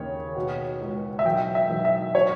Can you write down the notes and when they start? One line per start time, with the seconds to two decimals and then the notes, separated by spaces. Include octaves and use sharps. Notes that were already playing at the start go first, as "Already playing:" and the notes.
Already playing: D#2 C#3 C#5
0.36 B2
0.81 C#2
1.19 E5
1.25 B1 G5
1.55 E5
1.70 B1
1.85 E5
2.15 C#5